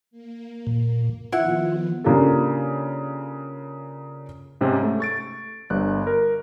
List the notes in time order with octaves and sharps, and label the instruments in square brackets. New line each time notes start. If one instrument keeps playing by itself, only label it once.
[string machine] A#3
[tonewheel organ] A#2
[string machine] D#3 F3 B3 [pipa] E4 F#5 [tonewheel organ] F4
[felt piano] C#3 A#3 D4 F4 G4 A4
[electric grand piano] G#2 C3 C4 C#4
A3
C#6 A6 D7
G1 G2 F#6
A#4